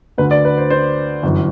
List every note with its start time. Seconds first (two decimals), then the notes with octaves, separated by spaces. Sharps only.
0.18 D2 D3 B4
0.31 D5
0.45 B4
0.57 C5
0.70 C5
1.23 G1 F#2 E3